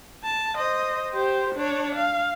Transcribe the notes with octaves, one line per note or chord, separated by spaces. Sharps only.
A5
C5 D#5
G4 C5
D4 C#5
F5